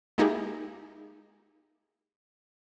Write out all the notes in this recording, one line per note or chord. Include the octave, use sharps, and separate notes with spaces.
G#3 A#3 D#4 E4 G4 G#4